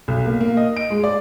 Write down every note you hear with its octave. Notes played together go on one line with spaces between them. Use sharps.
B1
A#3
A#3
D#5
D7
G#3
D5